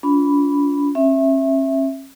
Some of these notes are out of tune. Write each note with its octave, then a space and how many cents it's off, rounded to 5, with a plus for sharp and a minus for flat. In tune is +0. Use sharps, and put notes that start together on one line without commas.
D4 -45 F4 +10 B5 +0
C#4 -40 E5 +0